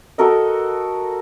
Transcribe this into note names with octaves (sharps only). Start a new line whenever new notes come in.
F#4 A4 A#4 D#5